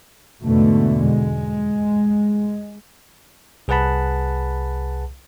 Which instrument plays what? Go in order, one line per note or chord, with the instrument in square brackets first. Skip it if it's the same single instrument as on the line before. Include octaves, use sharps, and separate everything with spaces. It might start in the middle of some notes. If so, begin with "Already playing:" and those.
[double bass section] E2 G#2 B2 D3 A3
G#3
[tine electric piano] C2 G#4 B4 F#5 A5 B5